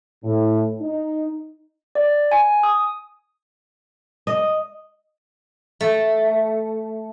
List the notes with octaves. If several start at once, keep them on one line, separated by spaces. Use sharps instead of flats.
A2
D#4
D5
G#5
D#6
D#5
A3